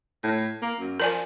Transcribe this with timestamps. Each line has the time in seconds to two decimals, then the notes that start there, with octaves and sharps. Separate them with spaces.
0.23 A2
0.62 A#3
0.79 F#2
1.00 F3 A#4 D5 G#5